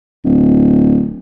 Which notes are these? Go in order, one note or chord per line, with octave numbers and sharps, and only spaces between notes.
D1